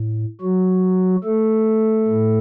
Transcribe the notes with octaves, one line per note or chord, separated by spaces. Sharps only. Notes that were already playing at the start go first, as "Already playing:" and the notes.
Already playing: A2
F#3 F#4
A3 A4
A2